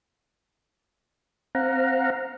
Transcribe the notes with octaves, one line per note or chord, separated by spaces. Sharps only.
C4 F5 F#5 A#5